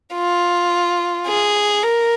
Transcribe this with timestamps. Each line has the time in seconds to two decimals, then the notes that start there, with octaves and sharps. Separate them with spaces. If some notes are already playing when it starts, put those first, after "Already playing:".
0.15 F4
1.27 G#4
1.83 A#4